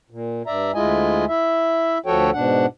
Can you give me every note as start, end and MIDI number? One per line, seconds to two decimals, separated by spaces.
0.10 0.42 46
0.46 0.72 43
0.46 0.72 74
0.46 0.72 76
0.46 0.72 82
0.74 1.25 38
0.74 1.25 56
0.74 1.25 64
0.74 1.25 65
0.74 1.25 75
0.74 1.25 80
1.28 1.98 64
1.28 1.98 76
2.06 2.30 38
2.06 2.30 53
2.06 2.30 66
2.06 2.30 69
2.06 2.30 73
2.06 2.30 79
2.33 2.66 44
2.33 2.66 47
2.33 2.66 62
2.33 2.66 78